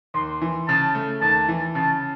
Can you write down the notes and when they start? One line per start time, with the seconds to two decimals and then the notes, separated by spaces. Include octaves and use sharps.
0.14 D#2 C6
0.42 E3
0.68 C#3 A5
0.95 A3
1.21 D#2 A5
1.48 E3
1.75 C#3 A5